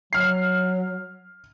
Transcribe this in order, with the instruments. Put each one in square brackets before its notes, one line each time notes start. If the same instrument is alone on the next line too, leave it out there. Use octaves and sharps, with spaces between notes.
[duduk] F#3 [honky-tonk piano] F6 C7